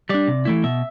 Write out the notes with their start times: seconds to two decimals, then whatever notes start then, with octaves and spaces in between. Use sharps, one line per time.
0.09 G3 D4 D5
0.28 C3
0.45 E3 A3 E4
0.63 B2 E5